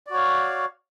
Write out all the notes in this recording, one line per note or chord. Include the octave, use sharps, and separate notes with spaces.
F#4 C#5 D5 F5